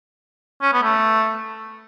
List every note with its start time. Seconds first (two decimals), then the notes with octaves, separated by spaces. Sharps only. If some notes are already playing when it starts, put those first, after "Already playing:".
0.62 C#4
0.73 B3
0.83 A3